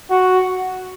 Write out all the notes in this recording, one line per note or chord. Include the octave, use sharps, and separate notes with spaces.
F#4